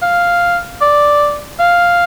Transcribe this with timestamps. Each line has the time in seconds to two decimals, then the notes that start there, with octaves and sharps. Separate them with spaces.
0.02 F5
0.81 D5
1.59 F5